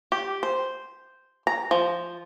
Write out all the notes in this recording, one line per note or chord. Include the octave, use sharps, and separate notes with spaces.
G4
C5
A#5
F3